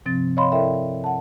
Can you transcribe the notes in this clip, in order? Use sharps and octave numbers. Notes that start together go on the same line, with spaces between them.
G2 C3 F3 C4 A6
C#5 D#5 F5 B5 C6
E4 A4 A#4 D5 E5 G5
F#5 A5